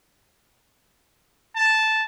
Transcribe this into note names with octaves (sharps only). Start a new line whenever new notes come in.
A5